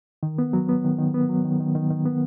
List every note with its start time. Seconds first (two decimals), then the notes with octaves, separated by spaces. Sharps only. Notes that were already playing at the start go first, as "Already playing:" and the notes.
0.23 D#3
0.38 B3
0.53 F#3
0.69 B3
0.84 D#3
0.99 D#3
1.14 B3
1.29 F#3
1.45 D#3
1.60 D#3
1.75 D#3
1.90 D#3
2.06 B3